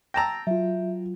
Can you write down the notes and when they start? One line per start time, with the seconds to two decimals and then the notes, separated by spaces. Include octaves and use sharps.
0.14 G5 A5 A#5 E6 A#6
0.47 F#3 F4 E5